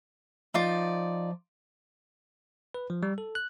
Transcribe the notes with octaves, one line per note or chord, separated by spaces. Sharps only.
F3 D#4 F4 D5
B4
F3
G3
A4
F#6